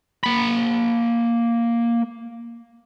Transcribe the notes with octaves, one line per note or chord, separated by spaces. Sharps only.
A#3 B5